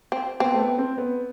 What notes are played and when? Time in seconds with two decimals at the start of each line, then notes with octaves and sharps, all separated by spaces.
0.12 C4
0.40 B3 C4
0.54 A3
0.59 B3
0.78 C4
0.98 B3